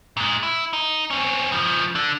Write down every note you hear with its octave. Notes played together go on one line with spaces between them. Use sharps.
A#2 G#3
E4
D#4
C4 C#4
C#3 F3
D3 D4